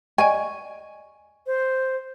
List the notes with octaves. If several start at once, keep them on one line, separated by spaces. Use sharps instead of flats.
D5 D#5 G#5 C#6
C5